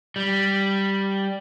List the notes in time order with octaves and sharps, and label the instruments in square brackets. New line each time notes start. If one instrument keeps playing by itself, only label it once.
[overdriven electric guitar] G3